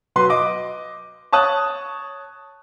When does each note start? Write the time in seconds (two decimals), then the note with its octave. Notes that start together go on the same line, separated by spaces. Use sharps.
0.16 F#3 B4 C6
0.29 D#5 D6
1.32 C#5 A5 D#6 F#6